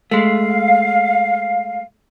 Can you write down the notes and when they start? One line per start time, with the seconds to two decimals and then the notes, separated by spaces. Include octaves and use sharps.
0.11 G#3 A3 F5